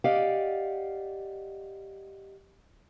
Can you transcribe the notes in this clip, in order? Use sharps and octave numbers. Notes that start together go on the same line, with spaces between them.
G4 D5 D#5 F5 F#5